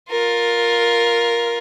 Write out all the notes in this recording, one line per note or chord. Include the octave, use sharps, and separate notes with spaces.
F4 A#4